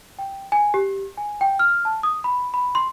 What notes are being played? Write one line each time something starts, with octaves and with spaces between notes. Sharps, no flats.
G5
G#5
G4
G#5
G5
F6
A5
D#6
B5
B5
C6